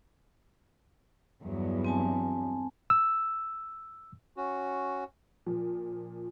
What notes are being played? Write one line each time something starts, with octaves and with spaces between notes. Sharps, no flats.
E2 G2 F#3
C4 G#5 A5
E6
C#4 F#4
A#2 F3